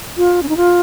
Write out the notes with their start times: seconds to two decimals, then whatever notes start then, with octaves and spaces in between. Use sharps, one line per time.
0.17 F4
0.43 C#4
0.49 D#4
0.57 F4